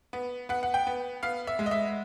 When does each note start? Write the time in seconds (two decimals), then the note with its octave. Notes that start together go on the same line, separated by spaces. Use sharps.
0.13 B3
0.49 B3 F#5
0.63 F#5
0.74 G5
0.87 B3
1.23 B3 F5
1.47 E5
1.59 G#3
1.66 D#5
1.71 E5